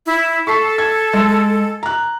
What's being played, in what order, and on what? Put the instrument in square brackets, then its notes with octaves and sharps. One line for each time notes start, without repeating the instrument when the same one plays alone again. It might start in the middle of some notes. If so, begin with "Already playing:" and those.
[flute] E4
[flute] A4 [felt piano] C#6 B6 C7
[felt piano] G#6
G#3
A#5 F#6